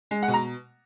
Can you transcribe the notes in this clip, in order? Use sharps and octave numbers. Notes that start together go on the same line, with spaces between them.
G#3
F#5
B2
A#5